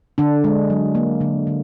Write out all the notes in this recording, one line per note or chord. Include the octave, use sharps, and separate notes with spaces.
D3 D4
G#3
F#3
A#3
D3
D3